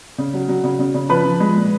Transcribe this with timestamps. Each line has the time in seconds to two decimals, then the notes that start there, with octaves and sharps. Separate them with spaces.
0.18 C#3
0.34 F#3
0.48 F#3
0.64 C#3
0.79 C#3
0.94 C#3
1.09 F3 B4 B5
1.25 F3
1.40 G#3
1.55 A#2